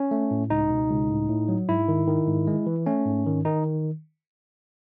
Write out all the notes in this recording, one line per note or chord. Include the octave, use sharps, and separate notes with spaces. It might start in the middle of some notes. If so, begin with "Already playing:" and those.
Already playing: C#4
A3
A2
C#2 D#4
B2
C#2
A2
A2
F#3
G#2 E4
D#3
D#3
G#2
G#3
E3
A3 C#4
G#2
D#3
D#3 D#4